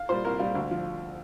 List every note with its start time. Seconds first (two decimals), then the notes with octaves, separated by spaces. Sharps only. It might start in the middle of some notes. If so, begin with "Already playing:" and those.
Already playing: F5
0.09 A#2 G3 C5
0.24 C2 A#4
0.39 A#2 G3 F4
0.55 D2
0.71 F3